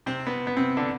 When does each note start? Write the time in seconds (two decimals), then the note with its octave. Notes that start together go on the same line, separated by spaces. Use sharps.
0.06 C3 C4
0.27 B3
0.47 B3
0.57 C3 C4
0.77 D3 D4